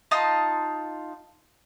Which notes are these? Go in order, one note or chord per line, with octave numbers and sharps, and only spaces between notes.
D#4 F4 A5 D#6